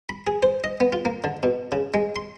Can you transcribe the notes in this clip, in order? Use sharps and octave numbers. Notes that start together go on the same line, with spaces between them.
B5
G#4
C5
D#5
B3
F4
A#3
D3
B2
C#3
G#3
C6